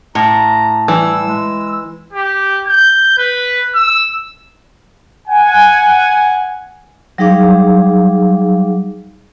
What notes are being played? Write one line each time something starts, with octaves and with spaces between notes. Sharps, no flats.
A2 A#5
E3 G3 E6
G#3
G4
G6
B4
E6
F#5 G#5
F#3 G3 D#4 G#4 F5 D6